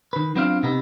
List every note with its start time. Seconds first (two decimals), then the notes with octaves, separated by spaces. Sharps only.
0.13 D#3 B4
0.35 F#3 B3 C4 D4 F4 F5
0.63 C3 B3 D#4